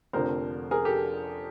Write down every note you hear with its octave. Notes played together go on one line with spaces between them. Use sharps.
F1 F2 D3 A#4 C5
G#4 A#4
G4 A4